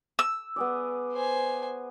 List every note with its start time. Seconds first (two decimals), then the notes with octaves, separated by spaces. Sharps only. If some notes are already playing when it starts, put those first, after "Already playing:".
0.19 E6
0.56 B3 G#4 D5
1.12 C5 G#5